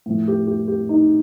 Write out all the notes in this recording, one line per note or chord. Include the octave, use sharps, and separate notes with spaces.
A2 F3
G4
G4
G4
D#4